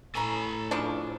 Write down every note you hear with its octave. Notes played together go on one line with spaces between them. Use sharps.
A2 A4 C#5 G#5 A#5 B5
C#3 F3 D4